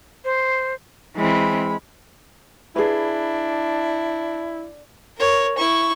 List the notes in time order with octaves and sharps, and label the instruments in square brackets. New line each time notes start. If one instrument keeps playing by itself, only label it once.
[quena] C5
[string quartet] E3 C4 [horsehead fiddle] G#3 B5
[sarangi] D4 [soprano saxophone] E4 [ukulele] G#4 B4
[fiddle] A#4 C#5
E4 C#6